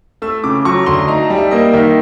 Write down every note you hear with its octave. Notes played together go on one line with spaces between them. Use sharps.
A3 E6
C#3 D6
F#3 C#6
D2 C6
D#4 A#5
A5
G3
E5
A#3 D#5
D#3 E5